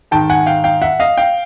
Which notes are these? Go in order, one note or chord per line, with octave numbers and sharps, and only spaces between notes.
G#2 D#3 G5 A5
F#5 G#5
F5 G5
F5 G5
E5 F#5
D#5 F5
F5 G5